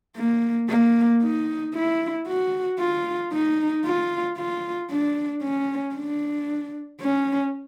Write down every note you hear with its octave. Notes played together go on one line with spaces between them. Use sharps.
A#3
A#3
D#4
E4
F#4
F4
D#4
F4
F4
D4
C#4
D4
C#4